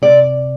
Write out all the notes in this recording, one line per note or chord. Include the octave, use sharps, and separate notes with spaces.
C3 D5